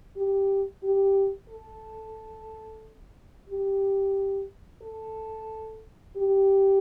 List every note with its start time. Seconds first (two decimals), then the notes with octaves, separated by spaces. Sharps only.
0.16 G4
0.83 G4
1.49 A4
3.49 G4
4.82 A4
6.16 G4